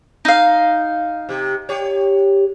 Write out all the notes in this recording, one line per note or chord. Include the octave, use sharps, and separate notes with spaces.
D#4 F5
C3 G4
G4 C#5